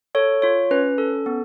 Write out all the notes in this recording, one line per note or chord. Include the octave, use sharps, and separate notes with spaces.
A4 C#5
F4 C#5
C#4 B4
A4
B3